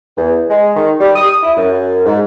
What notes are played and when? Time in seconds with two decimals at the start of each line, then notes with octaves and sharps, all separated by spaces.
0.17 E2
0.50 G#3
0.76 D#3
1.00 G3
1.15 D#6
1.43 E4
1.57 F#2
2.06 G#2